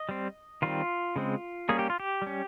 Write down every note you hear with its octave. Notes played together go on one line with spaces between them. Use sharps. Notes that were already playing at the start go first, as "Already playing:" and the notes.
Already playing: D#5
G3 C4
D#3 G3 C4 F4
C#3 G#3 C4
G3 A#3 C#4 G#4
G4
F4
G4
G3 C#4